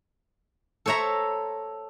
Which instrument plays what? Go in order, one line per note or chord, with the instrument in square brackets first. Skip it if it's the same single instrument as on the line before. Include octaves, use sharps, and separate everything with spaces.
[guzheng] A4 C5 C#5 E5 A#5